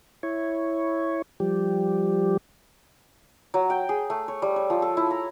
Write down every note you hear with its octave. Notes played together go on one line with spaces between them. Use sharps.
E4 C#5
F3 G3 G4
F#3
G5
G#4
A3
C#5
G3
C#5
F3
A4
E4
A#5